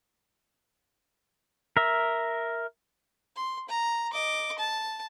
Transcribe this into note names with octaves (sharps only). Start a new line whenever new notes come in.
A#4 E5
C6
A#5
D#5 D6
A5